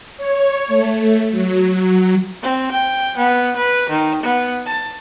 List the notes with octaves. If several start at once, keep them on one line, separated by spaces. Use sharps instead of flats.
C#5
A3
F#3
C4
G5
B3
B4
D#3
B3
A5